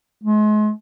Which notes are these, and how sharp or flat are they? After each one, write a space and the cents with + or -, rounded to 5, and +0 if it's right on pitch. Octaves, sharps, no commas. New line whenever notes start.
G#3 +35